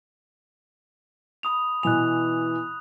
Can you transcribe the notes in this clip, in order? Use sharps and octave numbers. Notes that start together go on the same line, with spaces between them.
B5 D#6 F7
B2 E3 G#5 F#6 F7